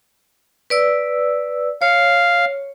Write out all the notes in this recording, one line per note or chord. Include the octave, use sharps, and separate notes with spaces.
B4 D5 E6
C#5 F5